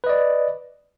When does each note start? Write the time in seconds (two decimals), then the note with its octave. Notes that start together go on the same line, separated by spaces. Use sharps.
0.04 B4
0.07 D#5
0.09 D5